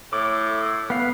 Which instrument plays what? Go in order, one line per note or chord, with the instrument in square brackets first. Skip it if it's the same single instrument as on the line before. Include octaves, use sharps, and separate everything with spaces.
[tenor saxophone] A2 [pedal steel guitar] D6
[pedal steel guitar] B3 F5